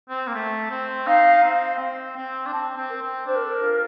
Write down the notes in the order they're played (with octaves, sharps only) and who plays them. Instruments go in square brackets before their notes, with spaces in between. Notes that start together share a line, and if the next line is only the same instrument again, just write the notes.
[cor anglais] C4
A#3
A3
C4
[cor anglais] D#4 [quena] F5
[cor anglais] C4
C4
C4
D4
[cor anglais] C4 [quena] A5
[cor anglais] C4
[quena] A#4
[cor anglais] C4
[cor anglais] D4 [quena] C5
[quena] A#4
A4
A#4
[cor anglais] F4